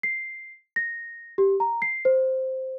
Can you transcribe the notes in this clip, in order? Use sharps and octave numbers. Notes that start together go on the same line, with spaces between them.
C7
A#6
G4
A#5
C7
C5